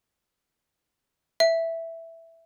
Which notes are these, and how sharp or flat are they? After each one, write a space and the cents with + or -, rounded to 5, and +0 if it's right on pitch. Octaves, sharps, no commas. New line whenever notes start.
E5 +0